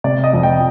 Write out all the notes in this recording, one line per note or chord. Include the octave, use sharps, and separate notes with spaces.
C3 D5
D#5
F2
G5